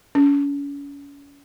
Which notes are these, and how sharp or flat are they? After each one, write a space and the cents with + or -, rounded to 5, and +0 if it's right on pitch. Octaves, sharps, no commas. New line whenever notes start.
C#4 +35